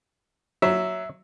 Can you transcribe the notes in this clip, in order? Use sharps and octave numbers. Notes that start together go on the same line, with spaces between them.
F#3 E5